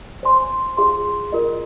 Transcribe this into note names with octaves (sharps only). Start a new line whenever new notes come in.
C5 G#5 C6
F4 G#4 F5 C6
F4 A#4 D#5